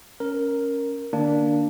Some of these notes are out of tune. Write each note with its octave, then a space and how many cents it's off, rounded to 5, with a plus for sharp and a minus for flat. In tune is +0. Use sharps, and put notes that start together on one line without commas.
C#4 +0 A#4 +0
D3 +40 A#3 +0 D4 +0